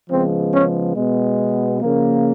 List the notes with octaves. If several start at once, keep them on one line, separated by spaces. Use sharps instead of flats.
C#3 F3 G#3 B3 C4
C#4
B2 G#3 B3
C#3 F3 A#3